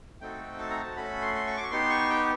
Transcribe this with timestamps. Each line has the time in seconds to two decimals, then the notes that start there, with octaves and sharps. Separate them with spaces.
0.21 A3 C4 D#4 F#4 A4 G5
0.59 A5
0.70 A#5
0.82 A5
0.96 A3 C#4 F#4 A4 B5
1.22 C6
1.35 C6
1.47 C#6
1.57 D6
1.64 C#6
1.71 B3 D#4 G4 C6
1.90 C#6
2.10 G5